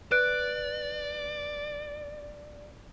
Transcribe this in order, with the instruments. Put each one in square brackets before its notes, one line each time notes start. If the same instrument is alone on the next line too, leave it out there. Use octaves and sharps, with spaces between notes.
[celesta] B4 F#6 D7 [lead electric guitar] D5